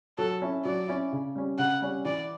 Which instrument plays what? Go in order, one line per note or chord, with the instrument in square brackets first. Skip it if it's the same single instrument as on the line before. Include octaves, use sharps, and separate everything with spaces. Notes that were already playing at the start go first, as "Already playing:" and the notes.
[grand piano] F#3 [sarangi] A4
[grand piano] C#4 E4
[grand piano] F#3 [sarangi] D5
[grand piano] C#4 E4
C#3
G3 C#4
[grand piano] C#3 [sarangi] F#5
[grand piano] G3 C#4
[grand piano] E3 [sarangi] D5